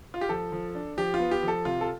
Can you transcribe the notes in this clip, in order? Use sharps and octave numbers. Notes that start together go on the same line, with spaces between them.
F4
G4
F3 A4
F3
D4
F3 G4
F4
B3
G4
F3
A4
C3 F4
A4